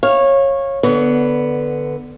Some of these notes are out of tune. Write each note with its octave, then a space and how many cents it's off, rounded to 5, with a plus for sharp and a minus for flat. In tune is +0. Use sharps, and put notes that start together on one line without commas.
C#5 -20 F5 +0
D3 +0 B3 +0 C#5 +40